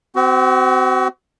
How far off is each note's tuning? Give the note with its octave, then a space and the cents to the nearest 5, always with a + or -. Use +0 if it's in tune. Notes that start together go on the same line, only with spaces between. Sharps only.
C4 -25 F#4 +30